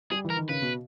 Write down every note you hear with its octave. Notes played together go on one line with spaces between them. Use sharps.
G3 G#4
E3
A#4
D#3
C#3 B4
B2